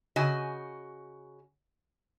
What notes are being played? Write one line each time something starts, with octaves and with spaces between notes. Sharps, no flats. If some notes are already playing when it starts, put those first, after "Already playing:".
C#3 F#4 D#5 G#5